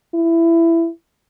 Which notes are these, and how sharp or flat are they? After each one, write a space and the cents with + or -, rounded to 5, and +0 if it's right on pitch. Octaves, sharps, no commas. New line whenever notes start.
E4 +15